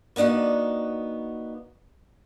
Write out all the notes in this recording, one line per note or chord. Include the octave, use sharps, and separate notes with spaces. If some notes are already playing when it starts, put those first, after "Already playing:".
A#3 B3 D4 D#4 F#4